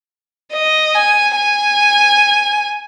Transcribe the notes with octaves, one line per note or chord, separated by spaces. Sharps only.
D#5
G#5
G#5